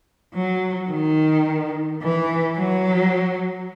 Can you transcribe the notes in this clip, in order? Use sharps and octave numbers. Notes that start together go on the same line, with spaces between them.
F#3
D#3
E3
F#3